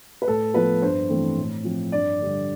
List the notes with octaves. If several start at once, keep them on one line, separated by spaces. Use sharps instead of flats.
B4
A2 A4
F3 B3 B4
G2 C5
E3 A3 C4
A2
F3 C4
G2 D5
D3 G3